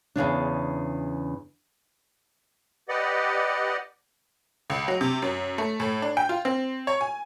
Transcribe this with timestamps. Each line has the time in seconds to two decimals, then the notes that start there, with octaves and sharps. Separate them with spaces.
0.16 E2 A2 C#3 D4
2.89 G4 B4 D5 D#5 F#5
4.70 C#2
4.88 F#3
5.01 C3
5.22 F#2
5.58 A3
5.80 A2
6.02 D4
6.17 G5
6.29 F4
6.45 C4
6.87 C#5
7.01 G#5